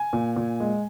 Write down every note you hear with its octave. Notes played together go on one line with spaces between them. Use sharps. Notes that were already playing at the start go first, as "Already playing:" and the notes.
Already playing: G#5
A#2
A#2
G#3